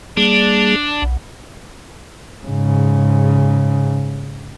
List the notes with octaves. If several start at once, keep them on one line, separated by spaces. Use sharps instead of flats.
G3 A#3 D4 G#4
B1
G#2 C#3